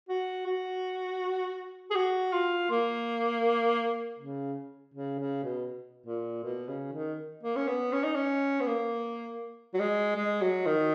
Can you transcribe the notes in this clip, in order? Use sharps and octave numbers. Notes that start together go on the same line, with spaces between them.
F#4
F#4
G#4
F#4
F4
A#3
C#3
C#3
C#3
B2
A#2
B2
C#3
D#3
A#3
C#4
B3
C#4
D#4
C#4
B3
A#3
F#3
G#3
G#3
F#3
D#3